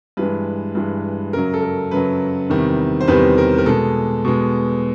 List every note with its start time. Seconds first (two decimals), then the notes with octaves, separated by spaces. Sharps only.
0.17 G2 E3 G#3 B4
0.75 G2 E3 G#3
1.33 F#2 C#3 F#3 A#4
1.54 A4
1.62 A#4
1.91 F#2 C#3 F#3 B4
2.50 E2 C3 D#3 G3
3.01 C5
3.08 E2 C3 D#3 G3 B4
3.38 A#4
3.58 A#4
3.66 B2 G#3 A4
4.25 B2 G#3